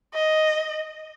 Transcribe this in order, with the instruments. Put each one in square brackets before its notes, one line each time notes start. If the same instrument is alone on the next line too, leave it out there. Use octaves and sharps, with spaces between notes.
[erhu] D#5